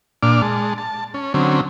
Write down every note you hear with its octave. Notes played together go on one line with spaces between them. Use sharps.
A#2 D4 D6 F6
G#3 A5
A5
C#4
D3 F#3 C4 C#4